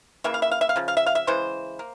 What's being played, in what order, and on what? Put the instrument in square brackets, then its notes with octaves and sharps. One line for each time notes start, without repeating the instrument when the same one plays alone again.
[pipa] C#3 E3 A#3 E5
F5
E5
F5
E5
F5
C#3 F3
F5
E5
F5
E5
C#3 E3 G#3 C5
A#3